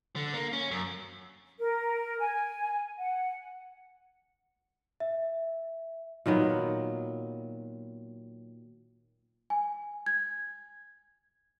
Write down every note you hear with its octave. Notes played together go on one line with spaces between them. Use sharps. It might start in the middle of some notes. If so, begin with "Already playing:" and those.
D3
A#3
C#4
F#2
A#4
G#5
F#5
E5
A#2 D#3 F#3 B3
G#5
G#6